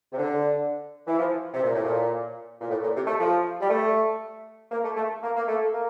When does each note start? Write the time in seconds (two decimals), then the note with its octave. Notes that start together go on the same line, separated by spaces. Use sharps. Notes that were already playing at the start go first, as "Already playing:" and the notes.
0.13 C3
0.17 D3
1.07 E3
1.18 F3
1.53 C3
1.63 A#2
1.74 A2
1.84 A#2
2.61 A#2
2.69 A2
2.82 A#2
2.96 C3
3.07 A3
3.20 F3
3.61 G3
3.70 A3
4.71 A#3
4.84 A3
4.96 A3
5.23 A#3
5.37 A#3
5.47 A3
5.72 A#3